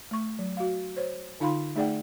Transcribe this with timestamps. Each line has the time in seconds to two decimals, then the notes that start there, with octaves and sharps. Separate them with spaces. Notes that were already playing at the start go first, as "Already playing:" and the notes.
0.11 A3 C#6
0.39 F#3
0.57 F#4 F5
0.96 C5 C#5
1.40 D3 D#4 F4 F5 B5 C6
1.76 A3 D#4 G#4 D5 F#5 G5